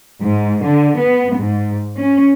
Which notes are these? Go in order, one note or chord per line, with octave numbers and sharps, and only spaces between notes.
G#2
D3
B3
G#2
C#4